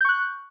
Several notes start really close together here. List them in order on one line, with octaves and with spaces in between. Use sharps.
G6 C#6 F#6